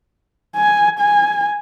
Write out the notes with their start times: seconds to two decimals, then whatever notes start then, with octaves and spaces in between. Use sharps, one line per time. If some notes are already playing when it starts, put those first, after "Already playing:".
0.56 G#5
1.00 G#5